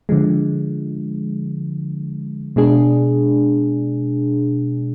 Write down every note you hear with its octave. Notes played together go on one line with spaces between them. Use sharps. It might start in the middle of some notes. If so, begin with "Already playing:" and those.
D3 F3 G#3
B2 G#3 D4 G#4